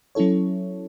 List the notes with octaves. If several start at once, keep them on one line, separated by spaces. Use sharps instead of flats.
F#3 C#4 E4 A4 C#5